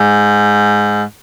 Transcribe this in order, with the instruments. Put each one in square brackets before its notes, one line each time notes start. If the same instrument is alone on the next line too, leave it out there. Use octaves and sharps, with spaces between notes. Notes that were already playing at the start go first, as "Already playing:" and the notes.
Already playing: [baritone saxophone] G#2